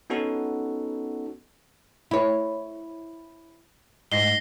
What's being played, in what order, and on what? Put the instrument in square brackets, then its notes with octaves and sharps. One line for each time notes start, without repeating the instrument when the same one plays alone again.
[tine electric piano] B3 C#4 D#4 F#4 A4
[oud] E4 C#5
[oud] G#2 [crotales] A#6 C7 G7